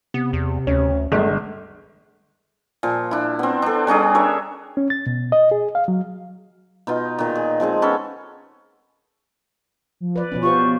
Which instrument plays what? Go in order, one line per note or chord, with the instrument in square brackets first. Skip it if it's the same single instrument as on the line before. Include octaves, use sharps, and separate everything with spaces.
[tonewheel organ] C3 [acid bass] B3
[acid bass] E2
[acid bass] D2 [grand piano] C#4
[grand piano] G1 G#3 [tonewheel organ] D3 [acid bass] A3
[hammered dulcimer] A#2 F3
D4 E4
B3 C4
D4 A4
G3 C#4 D4 G#4
A#4 C#5 E5
[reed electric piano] C#4
A6
B2
D#5
G#4
F5
F#3
[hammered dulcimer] B2 D#4 F4
A#2 D#3
G#4
F3 G#3 C4 G#4
B3 C#4 A4 A#4
[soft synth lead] F3
[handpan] B4 D5
[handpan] B2 F3 C#4 [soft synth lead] B3
[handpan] F4 G4 C5 [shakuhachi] C#6